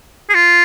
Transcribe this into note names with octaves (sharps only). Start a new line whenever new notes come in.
G#4
F4